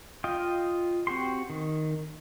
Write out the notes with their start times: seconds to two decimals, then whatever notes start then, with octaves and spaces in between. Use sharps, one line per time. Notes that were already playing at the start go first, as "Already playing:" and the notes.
0.24 F4 D#5 G5
1.07 C4 F#4 G4 C6
1.50 D#3